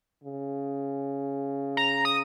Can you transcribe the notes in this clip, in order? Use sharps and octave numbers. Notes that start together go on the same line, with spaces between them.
C#3
A#5
D#6